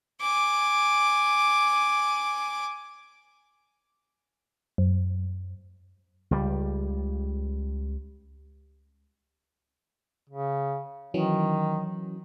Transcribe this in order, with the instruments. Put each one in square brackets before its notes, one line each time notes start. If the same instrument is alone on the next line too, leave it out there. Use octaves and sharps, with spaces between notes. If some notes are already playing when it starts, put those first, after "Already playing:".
[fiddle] G#5 D6
[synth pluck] F#2
[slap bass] C#2 G3
[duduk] C#3
[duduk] D#3 [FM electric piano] E3 F#3 C#4